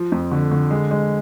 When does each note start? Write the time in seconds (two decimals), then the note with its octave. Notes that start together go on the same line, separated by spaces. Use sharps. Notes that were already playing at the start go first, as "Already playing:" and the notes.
Already playing: F3
0.12 F2
0.32 D3
0.51 D3
0.71 G#3
0.91 G#3